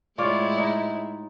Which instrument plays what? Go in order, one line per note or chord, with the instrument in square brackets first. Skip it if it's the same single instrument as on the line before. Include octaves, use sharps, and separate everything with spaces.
[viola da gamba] A2 G#3 E4 [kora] F4 C#5 D5
[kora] D#4